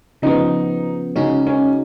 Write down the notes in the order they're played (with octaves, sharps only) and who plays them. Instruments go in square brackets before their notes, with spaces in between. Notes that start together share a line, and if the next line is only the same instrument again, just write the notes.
[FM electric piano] C#3 F3 B3 [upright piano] D#4
[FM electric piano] C#3 G#3 D#4 F#4 [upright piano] C#4
[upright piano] C#4